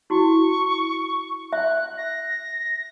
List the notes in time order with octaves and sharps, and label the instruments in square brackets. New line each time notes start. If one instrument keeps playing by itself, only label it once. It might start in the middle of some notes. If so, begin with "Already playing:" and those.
[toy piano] E4 F#4 [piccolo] C#6
[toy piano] E5 [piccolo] F#6
[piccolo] A#6